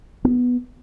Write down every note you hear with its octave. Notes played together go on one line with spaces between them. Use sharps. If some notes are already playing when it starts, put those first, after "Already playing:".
B3